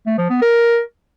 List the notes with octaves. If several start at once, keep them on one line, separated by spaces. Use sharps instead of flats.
A3
F3
B3
A#4